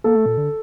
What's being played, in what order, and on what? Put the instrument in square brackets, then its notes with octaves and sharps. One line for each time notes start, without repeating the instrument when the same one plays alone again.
[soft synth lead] A#3 [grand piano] A4
[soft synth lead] A3
A#2
D3